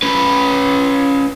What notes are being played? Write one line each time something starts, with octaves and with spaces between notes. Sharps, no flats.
C#4 B4